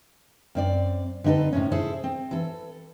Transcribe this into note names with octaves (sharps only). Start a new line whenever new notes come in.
F#2 C4 D5
D3 C4 D#4 A4 B4
A2 C3 C#4
E4 G#4 A4 C5
C4
E3 A4